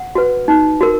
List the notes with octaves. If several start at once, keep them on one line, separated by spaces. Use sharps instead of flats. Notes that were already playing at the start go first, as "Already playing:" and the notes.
Already playing: F#5
F#4 B4
D#4
F#4 A#4